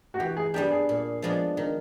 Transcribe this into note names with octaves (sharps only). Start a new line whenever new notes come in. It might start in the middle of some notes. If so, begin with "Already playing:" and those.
F#4
E3 G4
G#4
G3 B3 D4 G4
G#4
A#2
F3 G#3 B3 D4
D#3